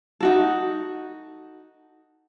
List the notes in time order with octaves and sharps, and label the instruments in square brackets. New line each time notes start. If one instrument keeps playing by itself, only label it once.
[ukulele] D#4 F#4 A4